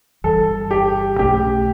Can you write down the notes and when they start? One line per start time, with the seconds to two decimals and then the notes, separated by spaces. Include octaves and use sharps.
0.24 G1 G2 E3 A4
0.71 G4
1.19 B1 B2 A3 C#4 G4